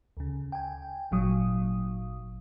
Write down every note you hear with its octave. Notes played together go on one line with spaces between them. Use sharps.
D2 C#3
G5 G#5
G#1 A#2 F#3 D#6